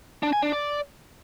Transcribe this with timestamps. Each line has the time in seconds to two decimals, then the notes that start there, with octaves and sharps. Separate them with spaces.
0.23 D4
0.33 G#5
0.42 D4
0.52 D5